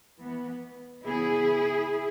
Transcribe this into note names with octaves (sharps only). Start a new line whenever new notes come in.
E3 B3
C#3 E3 B3 E4 G#4